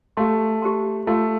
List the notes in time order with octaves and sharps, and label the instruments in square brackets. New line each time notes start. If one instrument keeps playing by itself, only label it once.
[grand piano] A3 [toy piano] G4 F5 C6
[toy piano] G4 C5 A5 C6
[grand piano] A3 [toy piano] F4 A4 F5 C6